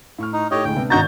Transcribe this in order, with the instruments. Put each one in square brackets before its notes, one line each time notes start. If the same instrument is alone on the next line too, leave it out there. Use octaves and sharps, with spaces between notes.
[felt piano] A2 C#6 F6
[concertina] D#4
[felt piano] A2 D#4 A4 [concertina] G4 C#5 D#5
[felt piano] D2 A2 G#3 [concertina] G5
[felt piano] C3 B3 D4
[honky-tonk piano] G#1 G6 A6 [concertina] D#4 F#4 A#5